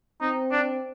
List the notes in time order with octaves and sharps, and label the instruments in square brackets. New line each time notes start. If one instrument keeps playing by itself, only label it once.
[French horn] C4 [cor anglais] D#4
[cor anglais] D4